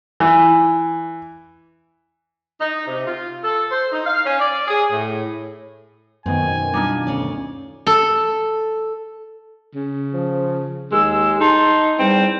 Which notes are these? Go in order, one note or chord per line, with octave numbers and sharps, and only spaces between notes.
E3
D#4
C3
F4
A4
C5
D#4
F5
C#4
D5
G#4
A2
F#2 B2 D#3 C4 G#5
G3 D4 D#4 F4
D2 C#4 D5
A4
C#3
F3
D#2 G#3 E6
D#4 A5 C6
E2 G3 C4